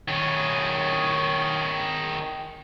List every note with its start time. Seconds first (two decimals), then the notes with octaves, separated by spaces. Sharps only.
0.08 D#3 C#4